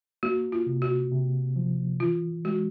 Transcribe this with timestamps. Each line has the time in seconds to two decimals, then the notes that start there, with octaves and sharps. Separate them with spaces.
0.23 A#3 F#4
0.52 F4
0.67 C3
0.82 F#4
1.11 C3
1.56 F3
2.00 E3 F4
2.45 G#3 F#4